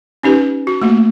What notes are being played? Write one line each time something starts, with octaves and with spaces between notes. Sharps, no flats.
C#4 D#4 G4 B4
F#4
A3 A#3 F#4